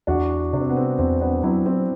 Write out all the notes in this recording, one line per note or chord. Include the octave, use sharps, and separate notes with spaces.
E2 D4 F#4
C3 D4
C4
B3
C4
E2 C4
B3 D4
F#3 C4 E4
C4 E4